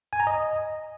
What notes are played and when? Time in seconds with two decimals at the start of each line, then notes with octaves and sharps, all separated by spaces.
0.13 G#5
0.20 A#5
0.27 D#5